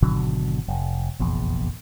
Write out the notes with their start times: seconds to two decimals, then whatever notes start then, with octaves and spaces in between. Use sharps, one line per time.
0.02 G#1 B2 D3 F#3
0.68 F1
1.19 F1 A#1 E2